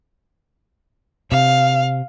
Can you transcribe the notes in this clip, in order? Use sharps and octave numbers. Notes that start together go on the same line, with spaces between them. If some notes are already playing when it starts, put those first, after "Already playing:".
C3 F5